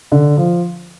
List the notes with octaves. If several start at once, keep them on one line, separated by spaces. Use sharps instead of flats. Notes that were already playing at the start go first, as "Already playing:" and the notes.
D3
F3